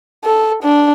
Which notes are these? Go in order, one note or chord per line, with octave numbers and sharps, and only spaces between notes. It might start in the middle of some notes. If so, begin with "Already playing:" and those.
A4
D4